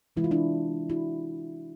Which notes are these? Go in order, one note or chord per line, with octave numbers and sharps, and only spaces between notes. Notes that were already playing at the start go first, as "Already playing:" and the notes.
C3 E3 G#3 E4
F4
D4 E4
E4 F#4